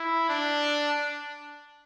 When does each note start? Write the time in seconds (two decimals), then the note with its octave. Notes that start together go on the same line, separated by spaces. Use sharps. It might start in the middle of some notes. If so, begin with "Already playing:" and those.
Already playing: E4
0.29 D4